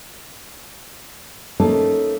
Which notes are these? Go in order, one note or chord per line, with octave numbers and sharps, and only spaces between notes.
A3 A#3 C#4 D#4 A4